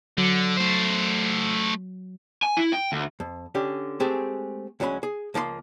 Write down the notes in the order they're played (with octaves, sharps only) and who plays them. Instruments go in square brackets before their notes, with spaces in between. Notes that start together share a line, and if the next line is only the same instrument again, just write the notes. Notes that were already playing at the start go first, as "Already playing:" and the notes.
[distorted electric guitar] D3 [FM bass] F#3
[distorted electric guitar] A3 C5
[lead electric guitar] G#5
E4
G5
D2
[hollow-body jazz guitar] F2
D3 C#4 G4
G#3 A3 C4 G4 G#4 G#5
D2 F#3 G#3 C#4 B5
G#4
C#2 F3 A#3 D#5 C6